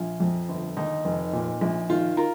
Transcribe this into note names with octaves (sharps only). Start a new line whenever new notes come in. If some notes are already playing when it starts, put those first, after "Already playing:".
Already playing: A#1 F4
F2
G1
D#2 D#4
F1
A#2
A#1
D#3 F4
F4 A#4